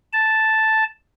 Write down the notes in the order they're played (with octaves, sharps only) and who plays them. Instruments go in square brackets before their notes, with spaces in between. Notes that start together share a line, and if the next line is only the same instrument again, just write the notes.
[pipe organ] A5